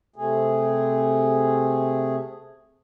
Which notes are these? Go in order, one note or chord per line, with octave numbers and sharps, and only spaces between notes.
C3 A3 G#4